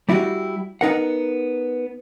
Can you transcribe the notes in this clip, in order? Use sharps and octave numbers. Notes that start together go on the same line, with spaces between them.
G3 E4 F#4 G4
B3 D#4 A#4 F#5